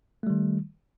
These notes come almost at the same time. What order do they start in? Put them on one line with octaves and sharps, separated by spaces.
A3 G3 D#3